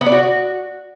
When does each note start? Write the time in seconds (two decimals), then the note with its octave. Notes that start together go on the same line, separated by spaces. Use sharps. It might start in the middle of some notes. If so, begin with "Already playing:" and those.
0.01 B3
0.06 D5
0.12 F#4